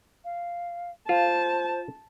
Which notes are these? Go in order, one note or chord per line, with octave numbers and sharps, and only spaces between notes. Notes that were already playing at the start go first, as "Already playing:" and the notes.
F5
F4 C5 A5